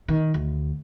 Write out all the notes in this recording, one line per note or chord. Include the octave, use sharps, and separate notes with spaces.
D#3
D2